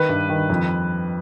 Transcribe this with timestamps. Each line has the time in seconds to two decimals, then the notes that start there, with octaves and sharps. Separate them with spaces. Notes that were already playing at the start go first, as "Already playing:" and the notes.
Already playing: D#3 B4
0.09 G2
0.29 D#3
0.50 F2